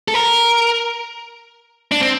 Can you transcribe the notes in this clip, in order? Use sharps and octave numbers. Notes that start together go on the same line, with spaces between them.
A4
A#4
D4
C4